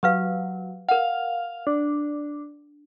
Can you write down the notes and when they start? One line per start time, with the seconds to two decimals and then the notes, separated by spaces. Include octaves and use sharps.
0.03 F#3 G4 B4 F5
0.89 A#4 F5 F#5
1.67 D4